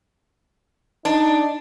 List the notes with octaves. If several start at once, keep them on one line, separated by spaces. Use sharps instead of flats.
D4 D#4